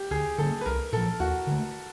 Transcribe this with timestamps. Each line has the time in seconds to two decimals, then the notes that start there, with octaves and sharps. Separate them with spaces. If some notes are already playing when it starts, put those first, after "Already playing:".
Already playing: G4
0.11 D2 G#4
0.38 D3 G3 A#3 A4
0.61 B4
0.66 C2 A#4
0.93 A#2 F3 A4
1.20 D#2 F#4
1.47 D3 F#3 A3